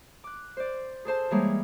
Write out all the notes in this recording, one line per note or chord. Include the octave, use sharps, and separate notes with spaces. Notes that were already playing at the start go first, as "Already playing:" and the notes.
D6 F#6
C5 D5
G#4 A4 C5 A5
E3 G3 G#3 A#3 G#4 C#5